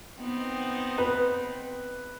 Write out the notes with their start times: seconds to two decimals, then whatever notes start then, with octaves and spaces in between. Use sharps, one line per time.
0.20 B3 C4 D#4
0.98 B4